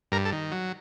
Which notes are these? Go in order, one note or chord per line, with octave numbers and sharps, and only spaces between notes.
G2 A#4
A4
D#3
F#3